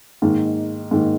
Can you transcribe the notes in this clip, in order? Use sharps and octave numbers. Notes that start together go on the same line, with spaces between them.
G#2 D#3 A#3
G#2 D#3 A#3